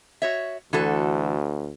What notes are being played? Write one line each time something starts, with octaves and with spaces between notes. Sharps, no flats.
F#4 C#5 E5
D2 E3 F#4 A4